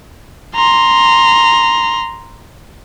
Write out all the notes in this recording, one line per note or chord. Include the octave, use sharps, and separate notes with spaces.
A#5 C6